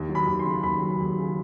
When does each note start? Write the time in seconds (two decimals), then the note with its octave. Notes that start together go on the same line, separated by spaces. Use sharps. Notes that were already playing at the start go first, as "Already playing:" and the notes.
Already playing: D#2
0.09 F#3
0.15 B5
0.27 D#2
0.39 C6
0.45 C#3
0.63 D#2 B5
0.82 F#3
1.00 D#2
1.18 C#3